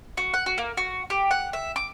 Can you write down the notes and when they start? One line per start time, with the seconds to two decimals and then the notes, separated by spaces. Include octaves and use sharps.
0.17 F#4
0.34 F#5
0.46 F#4
0.58 A#3
0.77 F#4
1.10 G4
1.31 F#5
1.53 E5
1.76 D6